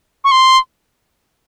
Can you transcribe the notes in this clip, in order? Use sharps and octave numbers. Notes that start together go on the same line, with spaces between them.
C#6
C6